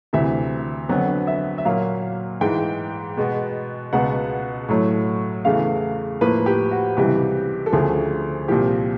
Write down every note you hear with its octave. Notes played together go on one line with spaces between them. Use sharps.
D2 C3 E3 E5
F2 D3 F#3 B3
E5
E5
A#2 F#3 A#3 F5
G#2 E3 G#3 G5
B2 G#3 B3
C#2 B2 G#3 B3 F#5
A2 F#3 A3
E2 C#3 E3 A3 F5
A2 F3 A#3 B4
G4
F#4
C#2 C3 E3 G3 G4
A4
D2 C#3 F3 A3 G#4
C2 A#2 F3 G4